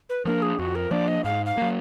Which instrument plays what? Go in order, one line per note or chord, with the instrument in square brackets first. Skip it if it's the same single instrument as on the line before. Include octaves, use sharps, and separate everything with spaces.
[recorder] B4
[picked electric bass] F3 A#3 D4 [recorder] A#4
[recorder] G#4
[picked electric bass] F2 [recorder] F#4
[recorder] A#4
[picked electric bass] F3 A#3 D4 [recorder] D5
[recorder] D#5
[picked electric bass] G#2 [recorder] F5
[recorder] F5
[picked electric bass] F#3 A#3